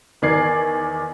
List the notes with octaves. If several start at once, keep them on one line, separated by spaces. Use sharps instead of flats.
E2 D#3 D5 D6 G#6 C7